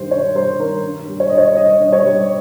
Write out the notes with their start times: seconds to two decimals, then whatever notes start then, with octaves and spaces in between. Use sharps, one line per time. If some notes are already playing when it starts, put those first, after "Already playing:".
Already playing: G2 D#3 G3 C5
0.11 G2 C#5
0.35 G3 C5
0.60 D#3 A#4
0.83 G2
1.08 G3
1.20 C#5
1.30 G2 D#5
1.38 C#5
1.56 G3 D#5
1.80 G2
1.93 C#5
2.04 G3